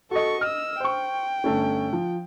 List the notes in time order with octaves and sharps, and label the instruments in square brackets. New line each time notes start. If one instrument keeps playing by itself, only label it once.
[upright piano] F#4 D#5 [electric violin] A4 C#6
[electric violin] D#5 E6 [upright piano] F6
[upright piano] C5 C#6 [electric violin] G5
[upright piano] G1 A3 C#4
F3